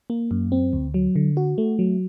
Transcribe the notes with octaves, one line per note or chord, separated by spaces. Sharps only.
A#3
F#2
C4
D2
F#3
D3
F#4
A3
F#3